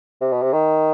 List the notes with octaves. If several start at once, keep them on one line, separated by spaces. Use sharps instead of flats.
C3
B2
C3
D#3